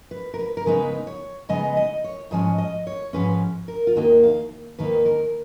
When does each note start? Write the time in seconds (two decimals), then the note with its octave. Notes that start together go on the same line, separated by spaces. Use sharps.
0.11 B4
0.34 A#4
0.39 B4
0.57 A#4
0.66 C#3 G#3 B3 D#4 B4
1.07 C#5
1.49 C#3 G#3 B3 D#4 D#5
1.77 D#5
2.04 C#5
2.31 G#2 F3 G#3 C#4 D#5
2.58 D#5
2.87 C#5
3.13 G#2 F3 G#3 C#4 B4
3.68 A#4
3.87 F4
3.96 D#2 D#3 A#3 D#4 F#4
4.23 F5
4.79 D#2 D#3 A#3 D#4 B4
5.06 A#4